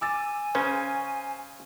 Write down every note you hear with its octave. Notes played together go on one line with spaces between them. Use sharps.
G#5 D6 E6 A6
C#3 C#4 C5